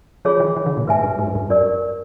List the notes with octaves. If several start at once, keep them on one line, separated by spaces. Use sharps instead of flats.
F3 F4 G#4 C#5
E3
E3
D3
A#2
G#2 B4 E5 G#5
G2
G#2
F#2
G2
F#2 G4 A#4 D5